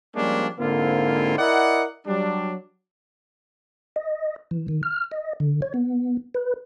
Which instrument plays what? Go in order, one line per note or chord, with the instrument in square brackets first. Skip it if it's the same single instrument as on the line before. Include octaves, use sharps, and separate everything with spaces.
[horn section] F3 G3 G#3 A#3 C#4 D4
G#2 D3 A#3 C4 E4 F4
E4 A#4 D5 D#5 F#5
F#3 G3 D4
[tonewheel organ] D#5
E3
D#3
F6
D#5
D3
C#5
B3
B4